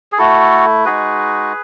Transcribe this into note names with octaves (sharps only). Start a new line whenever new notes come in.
G#4
A3 E4 F#4 A4
G#3 D#4 F#4 G#4 B4